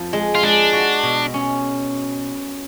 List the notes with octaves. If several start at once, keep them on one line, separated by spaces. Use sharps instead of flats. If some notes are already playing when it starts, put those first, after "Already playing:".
Already playing: F2 F3
G#3
F4
G#3 D4
F#4
B2
C#4